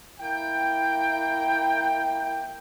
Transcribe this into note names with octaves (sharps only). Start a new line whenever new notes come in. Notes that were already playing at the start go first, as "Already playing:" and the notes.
A#3 E4 G5